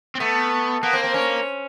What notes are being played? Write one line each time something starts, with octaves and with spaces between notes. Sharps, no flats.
C4
A3 B3
A#3 B3
C4
C4
C#4